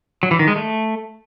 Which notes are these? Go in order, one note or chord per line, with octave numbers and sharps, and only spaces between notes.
F#3
E3
D#3
G#3
A3